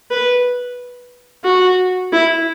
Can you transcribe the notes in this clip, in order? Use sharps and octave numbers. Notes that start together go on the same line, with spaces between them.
B4
F#4
E4